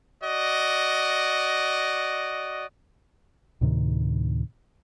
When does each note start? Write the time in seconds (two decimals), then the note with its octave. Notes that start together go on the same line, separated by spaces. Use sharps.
0.22 F#4 D5 D#5
3.61 D2 A2 C3 D#3